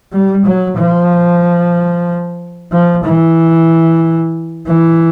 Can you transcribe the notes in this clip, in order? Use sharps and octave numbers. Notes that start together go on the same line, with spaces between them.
G3
F#3
F3
F3
E3
E3